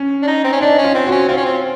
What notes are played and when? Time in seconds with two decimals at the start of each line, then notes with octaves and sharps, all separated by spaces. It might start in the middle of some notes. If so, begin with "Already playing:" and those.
Already playing: C#4
0.23 D4
0.27 D#4
0.44 C4
0.52 C#4
0.61 D4 D#4
0.78 C#4
0.84 F4
0.95 C4
1.07 F#4
1.12 C#4
1.28 C4 F4
1.37 C#4
1.45 C4